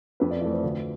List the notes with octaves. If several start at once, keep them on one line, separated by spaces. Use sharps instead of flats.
F2 B4
D5
E3 A3 D5
C5
D2 B4